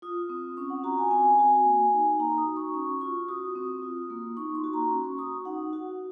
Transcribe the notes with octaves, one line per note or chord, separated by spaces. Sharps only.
F4 D#6
C4
C#4 C#6
F#5
F#4 A#5
G#5
C4 G#5
F#4
A#3
D#4
D#4 A#5
D#6
F#4
C#6
C#4 C#6
F4 C#6
F#4 D#6
C4
F4
A#3
D#4 C#6
C6
F#4
A#5
C#4
C#6
F#4 D#6
D#4 F#5
F#4